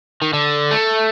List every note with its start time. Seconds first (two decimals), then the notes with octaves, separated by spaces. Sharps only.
0.22 D#3
0.33 D3
0.71 A3